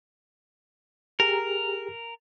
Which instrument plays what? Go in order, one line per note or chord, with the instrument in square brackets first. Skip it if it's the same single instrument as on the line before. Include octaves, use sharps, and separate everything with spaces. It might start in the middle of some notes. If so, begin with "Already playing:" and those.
[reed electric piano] G4 G#4 A#5 [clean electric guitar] A#4